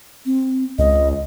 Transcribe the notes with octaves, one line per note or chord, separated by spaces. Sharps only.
C4
C#2 D#5